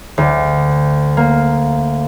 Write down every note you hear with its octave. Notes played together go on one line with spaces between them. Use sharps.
D2
A#3